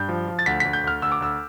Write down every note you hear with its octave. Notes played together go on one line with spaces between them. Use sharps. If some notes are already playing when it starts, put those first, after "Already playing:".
Already playing: G2 G6
F3
F3
A6
D2 B6
D2 B6
G6
D2 F6
D2 E6
D6
D2 E6